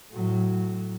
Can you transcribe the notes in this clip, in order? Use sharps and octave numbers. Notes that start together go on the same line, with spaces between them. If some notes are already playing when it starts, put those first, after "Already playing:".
A2 F#3